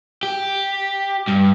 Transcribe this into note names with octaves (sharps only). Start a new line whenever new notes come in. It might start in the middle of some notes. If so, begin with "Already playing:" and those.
G4
G2